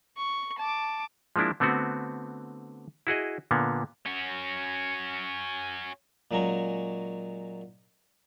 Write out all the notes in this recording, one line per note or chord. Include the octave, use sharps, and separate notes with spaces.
C#6
A5 D6
F3 G#3 A#3 D4 E4
D3 A3 B3 C4 F#4
E4 F#4 G#4 D#5
A#2 D3 A#3 B3
C#4 F#4
A#2 F#3 G#3 C#4 A#5 C#6